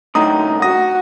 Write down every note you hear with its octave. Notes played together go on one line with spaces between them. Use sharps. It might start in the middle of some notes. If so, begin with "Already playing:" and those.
F#2 A2 D3 D#4 A#5 D#6
F#4 D#6 A#6